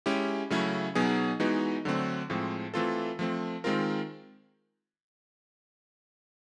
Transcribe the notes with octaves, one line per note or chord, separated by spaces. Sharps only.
G#3 C#4 E4 G4
C#3 F#3 A3 C#4 E4
B2 F#3 B3 D#4 G#4
E3 G#3 B3 D#4 F#4
D3 F#3 A3 C4
A2 F3 G#3 C4
E3 A3 C4 F4 A4
F3 A3 C4
D#3 G#3 C4 F4 A#4